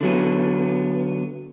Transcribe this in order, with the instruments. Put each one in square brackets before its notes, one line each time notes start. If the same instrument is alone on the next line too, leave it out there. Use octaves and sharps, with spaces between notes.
[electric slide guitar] D3 F#3 B3